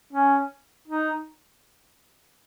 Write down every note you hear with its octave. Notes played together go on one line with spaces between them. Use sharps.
C#4
D#4